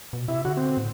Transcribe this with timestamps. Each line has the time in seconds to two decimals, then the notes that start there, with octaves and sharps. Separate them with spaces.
0.13 B2
0.28 C3 E4
0.45 D3 F#4
0.57 C4
0.77 A2